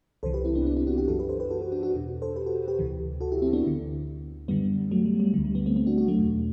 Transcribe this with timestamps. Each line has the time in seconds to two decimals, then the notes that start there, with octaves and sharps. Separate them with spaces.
0.23 C2 C3 E3 A4 C5
0.34 G4 B4
0.45 C4 E4
0.55 B3 D4
0.65 B3 D4
0.76 C4 E4
0.87 D4 F#4
0.98 E4 G4
1.08 F#2 E3 F#4 A4
1.19 G4 B4
1.29 A4 C5
1.40 G4 B4
1.51 F#4 A4
1.61 F#4 A4
1.72 D4 F#4
1.83 D4 F#4
1.94 E2 B2
2.22 A4 C5
2.36 G4 B4
2.46 F#4 A4
2.68 G4 B4
2.79 D2 C3 E3
3.21 F#4 A4
3.32 E4 G4
3.42 C4 E4
3.53 B3 D4
3.64 D2 D3
4.48 F#2 D3 G3 B3
4.91 F#3 A3
5.05 G3
5.20 G3
5.34 D3 G3
5.38 D2
5.45 G3
5.55 G3 B3
5.66 A3 C4
5.76 A3 C4
5.87 D4 F#4
5.98 D4 F#4
6.08 F#3 A3
6.18 E2 B2